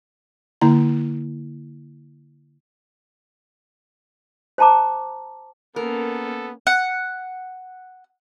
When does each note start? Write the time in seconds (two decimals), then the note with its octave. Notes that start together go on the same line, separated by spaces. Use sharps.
0.61 D3 A#3 E4 A#5
4.58 C5 G5 A5 A#5 D6
5.76 A#3 B3 C#4 A4 A#4
6.67 F#5